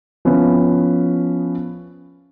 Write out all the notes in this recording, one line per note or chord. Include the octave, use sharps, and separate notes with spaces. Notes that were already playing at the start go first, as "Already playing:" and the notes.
F3 B3 C#4 E4